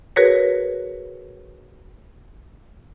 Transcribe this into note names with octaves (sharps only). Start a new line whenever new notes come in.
F#4 G#4 A#4 B4 C#5